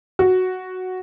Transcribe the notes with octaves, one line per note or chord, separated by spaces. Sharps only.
F#4